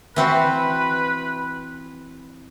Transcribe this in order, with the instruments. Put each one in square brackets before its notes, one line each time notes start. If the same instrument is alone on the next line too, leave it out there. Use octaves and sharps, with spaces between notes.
[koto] E3 C4 F#4 [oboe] B4